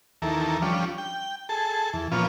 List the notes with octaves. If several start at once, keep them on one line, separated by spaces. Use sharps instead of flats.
D#2 E3 A4 A#4
F3 G3 C#4 D4
G5
G#4 A4 A5
E2
A#2 F3 B3 C#4 F4